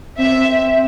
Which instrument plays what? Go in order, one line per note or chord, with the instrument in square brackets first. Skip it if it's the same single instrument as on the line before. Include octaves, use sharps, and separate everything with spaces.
[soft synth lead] C4 [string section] E5